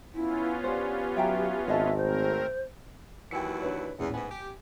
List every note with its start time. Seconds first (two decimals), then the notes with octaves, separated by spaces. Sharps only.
0.14 B3 C#4 E4 F4
0.64 D4 G4 C5
1.16 F#3 E5 G5 A#5
1.67 G#1 G#4 D#5 E5 A5
1.97 A3 C4 A#4 C5
3.31 D#2 E3 F#3 G5 G#5 C#7
3.62 D4 B4 C#5
3.99 D#1 E2 A2 C#4
4.14 G#2 B3 G#5
4.30 G4